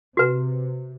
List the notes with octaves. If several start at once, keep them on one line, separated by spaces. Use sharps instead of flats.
C3 F#4 B4